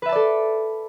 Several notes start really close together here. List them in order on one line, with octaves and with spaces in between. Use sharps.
B4 E5 A5 D5 A4